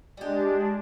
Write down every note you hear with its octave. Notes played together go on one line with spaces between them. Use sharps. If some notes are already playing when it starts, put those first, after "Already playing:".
G3 G#3 D4 G4